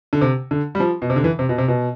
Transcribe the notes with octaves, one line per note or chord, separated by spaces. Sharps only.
D3
C3
D3
G3
F3
B2
C3
D3
E3
C3
B2
C3
B2